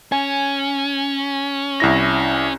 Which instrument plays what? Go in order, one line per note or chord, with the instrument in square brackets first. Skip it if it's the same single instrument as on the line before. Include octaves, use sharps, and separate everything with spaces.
[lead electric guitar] C#4 [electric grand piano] G#5
[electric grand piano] C2 E4 A#6